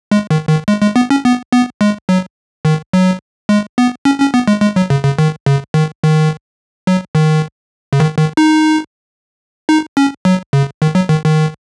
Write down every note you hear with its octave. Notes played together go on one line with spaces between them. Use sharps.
G#3
D#3
D#3
G#3
G#3
B3
C#4
B3
B3
G#3
F#3
D#3
F#3
G#3
B3
C#4
C#4
B3
G#3
G#3
F#3
C#3
C#3
D#3
C#3
D#3
D#3
F#3
D#3
C#3
D#3
D#3
D#4
D#4
C#4
F#3
C#3
D#3
F#3
D#3
D#3